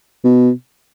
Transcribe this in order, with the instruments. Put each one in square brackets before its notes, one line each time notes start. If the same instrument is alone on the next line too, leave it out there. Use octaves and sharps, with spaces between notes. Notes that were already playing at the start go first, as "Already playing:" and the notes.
[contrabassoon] B2